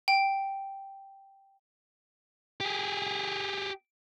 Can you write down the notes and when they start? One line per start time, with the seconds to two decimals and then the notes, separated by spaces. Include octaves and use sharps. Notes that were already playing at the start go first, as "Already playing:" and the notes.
0.08 G5
2.60 G4 G#4